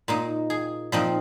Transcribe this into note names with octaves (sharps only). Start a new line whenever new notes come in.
A#2 A#3 D#4
G#4
A#2 F3 C4 D#4